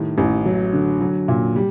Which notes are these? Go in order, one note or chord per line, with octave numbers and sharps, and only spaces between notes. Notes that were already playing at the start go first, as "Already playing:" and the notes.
Already playing: A2 D#3 G3
A1
F#3
D3
F#3
A#2
G3